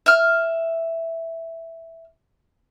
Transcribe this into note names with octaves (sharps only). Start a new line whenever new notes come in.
E5 F6